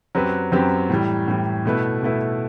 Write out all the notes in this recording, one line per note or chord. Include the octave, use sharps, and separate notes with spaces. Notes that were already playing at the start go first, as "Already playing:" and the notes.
F#2 F#3 C4 G4 B4
F#2 F#3 C4 G4 B4
A2 E3 G3
A2 E3 G3
B2 A3 E4 B4
B2 A3 E4 B4